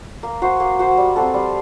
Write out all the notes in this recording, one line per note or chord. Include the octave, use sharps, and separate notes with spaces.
A#3
F#4 C5
A#3
F#4 C5
G3
C4 F#4 A4
G3